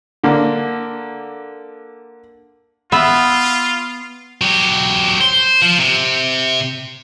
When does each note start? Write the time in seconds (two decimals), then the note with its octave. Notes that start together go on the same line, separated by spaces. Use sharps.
0.24 D3 A#3
2.92 B3 F4 E5
4.42 F#3 G4
5.21 C5
5.62 F3
5.79 C3